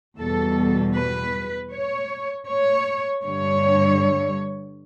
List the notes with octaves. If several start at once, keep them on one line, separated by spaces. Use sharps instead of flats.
E2 B2 G3 A4
B4
C#5
C#5
G2 D3 G3 C#5